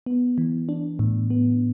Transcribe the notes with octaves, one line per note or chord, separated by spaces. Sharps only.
B3
E3
D4
A2
B3